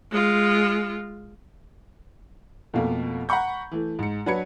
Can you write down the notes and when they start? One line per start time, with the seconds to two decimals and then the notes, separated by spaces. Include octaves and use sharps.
0.11 G#3 F4
2.74 F2 B2 A3 A#3
3.29 F#5 A#5 B5 C#6 G6
3.71 E3 A3
3.99 G#2 C#7
4.26 F#3 D4 B4 B5 G#6 C#7